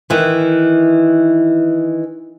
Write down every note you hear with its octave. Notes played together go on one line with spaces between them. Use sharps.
D#3 E3